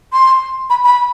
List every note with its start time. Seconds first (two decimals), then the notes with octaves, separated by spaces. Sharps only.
0.13 C6
0.70 B5
0.84 B5